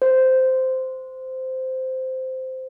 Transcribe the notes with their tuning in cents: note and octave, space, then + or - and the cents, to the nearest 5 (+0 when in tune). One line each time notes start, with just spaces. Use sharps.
C5 -10